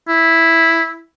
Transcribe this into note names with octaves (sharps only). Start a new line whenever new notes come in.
E4